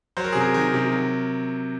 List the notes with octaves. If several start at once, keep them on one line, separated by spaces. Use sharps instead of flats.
F#3 C5
A#4
C3 G#4
A#4
D#3 A#4
C3
F#3